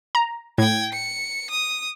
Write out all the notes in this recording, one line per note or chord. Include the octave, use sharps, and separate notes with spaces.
A#5
A2 G5 G#6
C#7
D#6